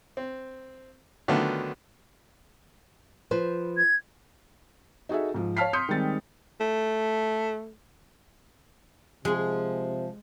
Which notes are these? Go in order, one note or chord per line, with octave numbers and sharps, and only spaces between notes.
C4
D3 D#3 F#3 A3 B3 F4
F3 B4 C5
G#6
D#4 F#4 G#4 A4 E5
G#2 F3
C#5 F5 A5 F6 B6 C7
C6 D#6 G6 C#7
D#3 G3 G#3 C4 A6
A3
C3 F3 G#3 G#4